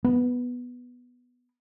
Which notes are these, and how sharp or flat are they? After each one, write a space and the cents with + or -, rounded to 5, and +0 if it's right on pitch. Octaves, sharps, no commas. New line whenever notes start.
B3 -5